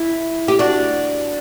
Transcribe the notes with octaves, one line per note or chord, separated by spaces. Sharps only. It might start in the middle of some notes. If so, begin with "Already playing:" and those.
Already playing: E4
G4
D4 F#4